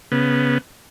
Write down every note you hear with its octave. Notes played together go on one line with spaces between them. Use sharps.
C#3 B3